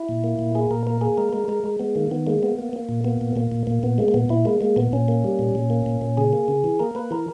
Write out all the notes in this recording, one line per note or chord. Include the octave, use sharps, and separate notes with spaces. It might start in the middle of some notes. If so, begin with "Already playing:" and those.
Already playing: E4
A#2
A#3
A#2
A#3 G#4
A#2 A#4
A#3 A#4
A#3 G#4
G#3 A#4
G#3 A#4
G#3 A#4
G#3
G#3 B3
D#3 A#3
D#3 B3
G#3 A#3
A#3 B3
A#3
A#3
A#2
A#3 B3
A#2
A#2 A#3
A#2
A#2 A#3
A#2 B3
G#3 A#3
A#3
A#2 B3
A#2 E4
G#3 A#3
G#3 A#3
A#2 B3
A#2 C#4
A#3
G3
A#2
A#2
A#3
A#2
A#2
C#3 G#4
A#3
C#3
E3
A#3 A#4
A#3 B4
E3 A#4